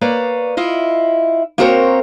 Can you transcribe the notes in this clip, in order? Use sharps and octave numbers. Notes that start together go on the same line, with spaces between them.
A#3 B4 C#5 D5
E4 F4 D#5
A#3 C4 F#4 A#4 C5 C#5